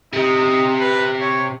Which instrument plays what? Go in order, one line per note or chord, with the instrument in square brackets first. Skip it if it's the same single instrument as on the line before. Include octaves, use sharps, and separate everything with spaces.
[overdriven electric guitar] C3 [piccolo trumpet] D#4
[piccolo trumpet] B4
C#5